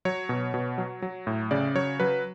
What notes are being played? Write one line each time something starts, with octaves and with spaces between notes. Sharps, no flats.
F#3 C#5
B2
B2
F#3
F#3
A2
C#3 D5
F#3 C#5
F#3 B4